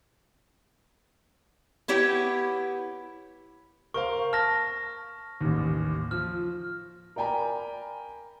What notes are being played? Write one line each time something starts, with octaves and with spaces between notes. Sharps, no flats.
B3 E4 G4 C#5 G5
A#4 C5 F5 C#6
A5 F6 A#6
A1 D#2
F3 F6
A#4 D5 G5 G#5 A#5 B5